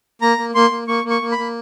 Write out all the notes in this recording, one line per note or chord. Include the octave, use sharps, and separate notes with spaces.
A#3 A#5
A#3
A#3 C6
A#3
A#3 C#6
A#3
C#6
A#3
B5
A#3